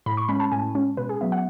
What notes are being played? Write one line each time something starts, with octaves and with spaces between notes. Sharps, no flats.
A2 B5
C#6
G#3 C#4 B5
A5
A2 G#5
G#3 C#4
B2 B4
G#4
F#3 B3 E5
F#5